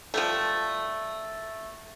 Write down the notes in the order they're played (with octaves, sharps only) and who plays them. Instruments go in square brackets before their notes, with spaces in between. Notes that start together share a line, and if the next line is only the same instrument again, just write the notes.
[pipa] F3 G3 A3